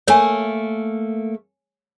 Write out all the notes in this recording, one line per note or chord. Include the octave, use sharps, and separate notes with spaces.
A3 A#3 C#5 G#5